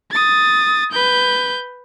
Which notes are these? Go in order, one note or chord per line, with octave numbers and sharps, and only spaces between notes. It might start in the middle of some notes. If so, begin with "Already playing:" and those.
D#6 A6
B4 G6